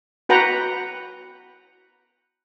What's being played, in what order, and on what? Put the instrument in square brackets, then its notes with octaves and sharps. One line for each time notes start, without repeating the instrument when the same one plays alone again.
[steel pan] F#4 B4 F#5 G5 A#5 B5